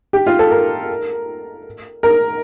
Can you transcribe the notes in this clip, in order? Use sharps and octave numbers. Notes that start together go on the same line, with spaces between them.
G4
F4
A4
A#4
A#4